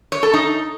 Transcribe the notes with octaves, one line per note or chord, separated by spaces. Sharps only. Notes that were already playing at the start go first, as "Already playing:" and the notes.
C#5
A4
D#4